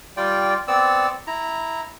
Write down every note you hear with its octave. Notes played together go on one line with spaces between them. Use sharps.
G3 F4 D5 G5
B3 C4 D5 E6
E4 A#5